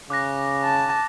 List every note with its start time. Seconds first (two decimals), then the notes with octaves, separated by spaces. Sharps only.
0.10 C#3 D6 F#6 A#6
0.64 A5